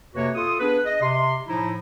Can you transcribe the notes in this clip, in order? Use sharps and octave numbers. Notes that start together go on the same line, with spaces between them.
F2 C3 A#3 F#4 B4 C#5
F4 A4 C6 D#6
B3 D4 G#4 B4
D#5
C3 C6
A2 F3 D#4 E4